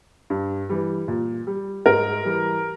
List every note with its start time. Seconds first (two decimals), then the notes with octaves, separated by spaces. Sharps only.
0.30 G2
0.69 E3 G3
1.08 A#2
1.47 G3
1.86 G#2 A#4
2.25 E3 G3